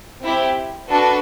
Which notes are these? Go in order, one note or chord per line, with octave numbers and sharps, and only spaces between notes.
C4 E4 G4
D4 F#4 A4 B4